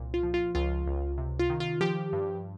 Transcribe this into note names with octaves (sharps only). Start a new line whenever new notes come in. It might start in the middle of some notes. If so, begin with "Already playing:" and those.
Already playing: C2 A#2
F4
F3
F4
C#2 F4
C#2
C3
F4
D#3
F4
F3 G4
G2